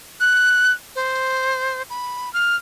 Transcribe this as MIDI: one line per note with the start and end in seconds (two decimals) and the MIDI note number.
0.20 0.72 90
0.96 1.82 72
1.90 2.32 83
2.33 2.56 89